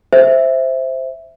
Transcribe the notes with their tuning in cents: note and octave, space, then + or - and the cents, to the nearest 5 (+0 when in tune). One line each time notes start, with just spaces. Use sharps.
C5 +0 E5 +0